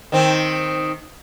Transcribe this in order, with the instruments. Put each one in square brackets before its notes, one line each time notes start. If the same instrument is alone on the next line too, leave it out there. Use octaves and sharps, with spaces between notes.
[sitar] D#3 C4